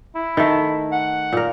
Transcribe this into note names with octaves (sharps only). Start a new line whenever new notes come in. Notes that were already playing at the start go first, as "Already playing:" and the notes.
E4
D#3 A3
F#5
A#2 A#4